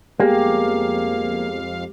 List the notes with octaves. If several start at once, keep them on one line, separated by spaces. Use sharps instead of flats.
F2 G#3 A#3 B3 G4 G#4 F5